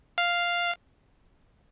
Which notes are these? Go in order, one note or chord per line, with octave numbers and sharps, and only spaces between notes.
F5